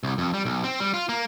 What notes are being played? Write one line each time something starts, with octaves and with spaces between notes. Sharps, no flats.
C2
F2
G3
B1
C4
G3
F4
A#3